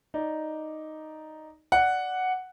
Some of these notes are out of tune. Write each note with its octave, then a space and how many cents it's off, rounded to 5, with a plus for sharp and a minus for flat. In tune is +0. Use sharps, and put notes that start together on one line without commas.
D#4 +0 D5 +0
D5 +0 F#5 +0